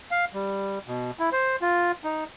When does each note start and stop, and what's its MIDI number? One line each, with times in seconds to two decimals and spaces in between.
0.11 0.25 77
0.34 0.79 55
0.88 1.11 47
1.19 1.30 64
1.32 1.56 72
1.62 1.92 65
2.04 2.24 63